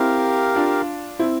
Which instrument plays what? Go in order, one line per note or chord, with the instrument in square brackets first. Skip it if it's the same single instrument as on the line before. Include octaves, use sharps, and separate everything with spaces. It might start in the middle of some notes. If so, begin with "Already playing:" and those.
Already playing: [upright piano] C4 E4 [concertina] G4 A#4 F5
[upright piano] D4 F4
C4 E4